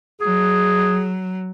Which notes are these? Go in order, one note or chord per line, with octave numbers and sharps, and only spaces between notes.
F#3 G#4